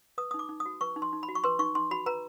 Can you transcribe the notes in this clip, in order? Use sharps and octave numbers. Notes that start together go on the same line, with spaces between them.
B4 D#6
D#6
D#4
D6
D#4
D#6
F#4
B4 C#6
D#4
C6
D#4
B5
F#4
C#6
B4 C6
D#4 C#6
D#4 C6
F#4 B5
B4 A#5